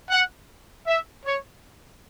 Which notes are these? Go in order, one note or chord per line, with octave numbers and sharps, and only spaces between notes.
F#5
E5
C#5